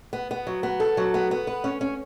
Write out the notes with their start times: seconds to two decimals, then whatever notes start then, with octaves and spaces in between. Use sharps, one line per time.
0.13 B3
0.31 B3
0.47 F#3
0.63 B3
0.80 A4
0.97 F#3
1.14 B3
1.31 B3
1.47 B4
1.64 C#4
1.81 C#4